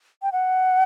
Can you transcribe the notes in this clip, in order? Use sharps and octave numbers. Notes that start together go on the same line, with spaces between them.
G5
F#5